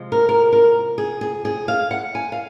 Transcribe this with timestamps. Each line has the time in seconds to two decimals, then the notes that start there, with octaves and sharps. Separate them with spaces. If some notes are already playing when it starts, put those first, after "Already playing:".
Already playing: C3 F3 G#3
0.12 A#4
0.29 A#4
0.53 A#4
0.98 G#4
1.21 G#4
1.45 G#4
1.68 F5
1.91 F#5
2.15 G#5
2.32 F5